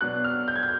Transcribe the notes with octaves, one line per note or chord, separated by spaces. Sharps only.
B2 F#3 B3 D4 F#6
F6
G6
G#6
G6